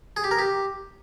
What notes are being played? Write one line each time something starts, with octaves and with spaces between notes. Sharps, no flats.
G#4
G4
A#4
G4